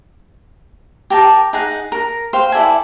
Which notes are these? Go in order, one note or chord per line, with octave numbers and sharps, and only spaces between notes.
G4 A#4 G5 A5
D#4 G#4 D#5 F#5
A#4
C5 F5 G5
E4 A4 D5 G#5